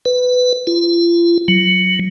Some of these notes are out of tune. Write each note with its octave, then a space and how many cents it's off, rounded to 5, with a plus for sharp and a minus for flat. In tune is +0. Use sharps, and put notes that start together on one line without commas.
B4 +15
F4 -40
F#3 +10